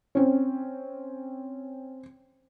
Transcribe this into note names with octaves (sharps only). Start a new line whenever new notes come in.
C4 C#4